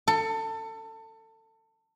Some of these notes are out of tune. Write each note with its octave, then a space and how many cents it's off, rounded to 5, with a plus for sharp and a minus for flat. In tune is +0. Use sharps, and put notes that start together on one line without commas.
A4 +25